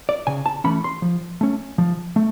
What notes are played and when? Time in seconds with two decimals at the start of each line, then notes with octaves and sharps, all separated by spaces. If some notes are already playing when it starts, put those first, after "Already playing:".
0.09 D5
0.27 C#3 G#5
0.46 A5
0.64 E3 A3 C#4 B5
0.84 C6
1.02 F3
1.41 A3 C#4
1.78 F3
2.16 A3